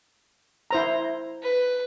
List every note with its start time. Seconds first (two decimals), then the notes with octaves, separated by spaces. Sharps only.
0.71 E4 C5 A#5
1.43 B4